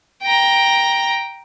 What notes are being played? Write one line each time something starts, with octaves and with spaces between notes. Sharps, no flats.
G5 A#5